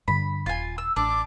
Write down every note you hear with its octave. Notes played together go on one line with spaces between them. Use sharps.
G2 D3 B5
D#1 F4 G#5
E6
A1 D4 D6